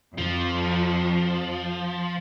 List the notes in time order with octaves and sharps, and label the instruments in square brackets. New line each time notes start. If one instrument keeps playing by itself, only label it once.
[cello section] F2 [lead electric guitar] F3